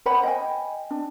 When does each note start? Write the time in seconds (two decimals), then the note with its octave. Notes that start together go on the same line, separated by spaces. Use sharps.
0.06 C5 C#5 F#5 B5
0.23 D#5 G5 G#5
0.91 D4